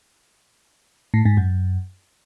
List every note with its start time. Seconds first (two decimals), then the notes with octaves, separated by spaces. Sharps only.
1.14 A2
1.25 G#2
1.37 F#2